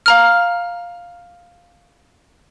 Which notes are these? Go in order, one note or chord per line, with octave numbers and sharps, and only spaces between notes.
F5 A#5 F6